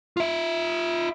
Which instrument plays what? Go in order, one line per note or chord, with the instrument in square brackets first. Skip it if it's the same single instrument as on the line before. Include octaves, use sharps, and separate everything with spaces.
[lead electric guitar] F4 E5